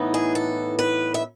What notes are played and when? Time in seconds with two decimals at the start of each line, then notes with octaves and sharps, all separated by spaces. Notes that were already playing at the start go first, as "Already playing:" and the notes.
Already playing: A2 E3 B3 D#4
0.14 G#4
0.35 A4
0.79 B4
1.14 E5